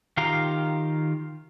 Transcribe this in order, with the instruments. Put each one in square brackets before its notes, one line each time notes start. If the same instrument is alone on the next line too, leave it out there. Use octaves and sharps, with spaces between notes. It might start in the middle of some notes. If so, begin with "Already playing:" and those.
[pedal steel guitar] D#3 F4 G4 F5 A#5